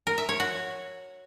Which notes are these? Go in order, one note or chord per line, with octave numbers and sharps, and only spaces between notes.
A#4
E5
C#5
F#4